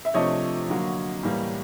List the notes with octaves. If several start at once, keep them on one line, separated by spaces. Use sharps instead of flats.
E5
C3 F3 A3 D4 C#5 D#5
D3 F#3 A#3
A2 E3 G3 A#3